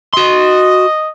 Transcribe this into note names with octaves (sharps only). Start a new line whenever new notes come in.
F#4 D#5 C6